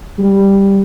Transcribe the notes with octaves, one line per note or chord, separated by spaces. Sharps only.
G3